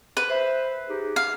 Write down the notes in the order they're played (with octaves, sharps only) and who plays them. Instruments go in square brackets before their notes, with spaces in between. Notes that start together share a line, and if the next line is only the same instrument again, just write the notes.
[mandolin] B4
[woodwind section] C5 E5
D#4 G4 G#4
[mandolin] F5